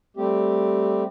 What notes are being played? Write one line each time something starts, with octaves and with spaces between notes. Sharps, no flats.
G3 A3 C4 G4